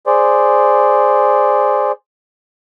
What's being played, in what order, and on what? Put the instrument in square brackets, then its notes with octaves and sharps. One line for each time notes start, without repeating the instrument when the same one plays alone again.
[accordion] G#4 C5 D5